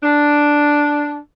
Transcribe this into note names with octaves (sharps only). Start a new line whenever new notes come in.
D4